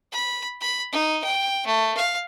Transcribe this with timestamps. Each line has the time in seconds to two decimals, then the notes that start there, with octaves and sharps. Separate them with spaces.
0.12 B5
0.61 B5
0.92 D#4
1.24 G5
1.66 A3
1.97 F5